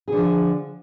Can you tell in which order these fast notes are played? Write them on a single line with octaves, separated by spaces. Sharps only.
G#4 D3 F3